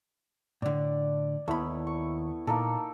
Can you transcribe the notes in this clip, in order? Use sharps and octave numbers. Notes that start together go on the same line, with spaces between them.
A2 D3 D5
D#2 A3 B3 E4 B5
C#6
A#2 A#3 D#4 A4